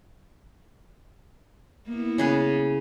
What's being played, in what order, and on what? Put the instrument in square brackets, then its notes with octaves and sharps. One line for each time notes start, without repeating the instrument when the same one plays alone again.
[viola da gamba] A#3 B3 E4
[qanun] C#3 G#4 B4